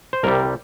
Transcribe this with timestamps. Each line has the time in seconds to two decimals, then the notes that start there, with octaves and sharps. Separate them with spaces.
0.13 C5
0.23 C2 C3 G3 A#4